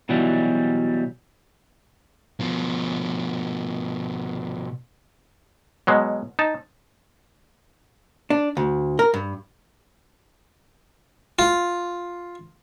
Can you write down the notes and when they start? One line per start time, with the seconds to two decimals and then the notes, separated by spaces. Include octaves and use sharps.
0.09 B2 E3 F#3 G3
2.40 B2 F3
5.87 B2 F#3 G#3
6.39 D#4 A5
8.30 D4
8.57 D2
8.99 A#4
9.14 G2
11.39 F4